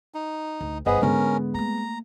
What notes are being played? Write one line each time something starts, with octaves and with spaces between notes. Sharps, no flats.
D#4
D2
G1 B3 D#4 G#4 B4 C5 D#5
G#2 D3 G#3 B3 C#4 G#4 A#4
A3 A#3 A#5